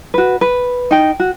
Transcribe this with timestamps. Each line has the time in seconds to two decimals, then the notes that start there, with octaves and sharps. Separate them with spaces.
0.14 F#4 B4
0.41 B4
0.91 D#4 G5
1.20 F#4